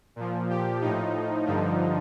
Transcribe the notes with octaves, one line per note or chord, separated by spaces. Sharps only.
A#2 F3
G4
A2 F3 D#4
G2 D3 F3